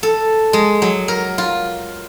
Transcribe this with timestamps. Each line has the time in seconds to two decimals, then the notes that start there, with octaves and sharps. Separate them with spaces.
0.03 A4
0.53 G#3
0.82 F#3
1.08 A#4
1.38 F4